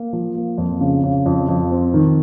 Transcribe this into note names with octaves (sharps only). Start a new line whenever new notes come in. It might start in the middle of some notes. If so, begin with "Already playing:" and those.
Already playing: A#3
F3
A#3
F2
C#3
C#3
F2
F2
C4
D#3